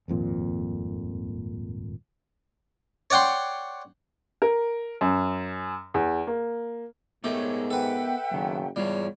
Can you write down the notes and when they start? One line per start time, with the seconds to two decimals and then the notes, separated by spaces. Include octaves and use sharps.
0.08 D#1 G#1 F2 A#2
3.10 C#5 D5 F#5 G5 C6
4.42 A#4
5.01 F#2
5.94 E2
6.27 A#3
7.24 G#2 A3 B3 G4 A#4 C#5 D#5
7.71 A4 B4 E5 F#5 G5
8.31 F#1 F#2 D#3
8.76 E2 G#2 G3 F4 C#5